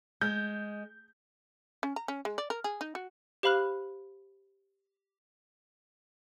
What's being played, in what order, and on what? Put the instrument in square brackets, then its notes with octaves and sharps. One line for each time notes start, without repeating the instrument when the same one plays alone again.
[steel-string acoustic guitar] G#3 [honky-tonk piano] G6
[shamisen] C#4
A#5
C#4
G#3
D5
A#4
G#4
D#4
F#4
[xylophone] G4 C5 F5 B5 F6 F#6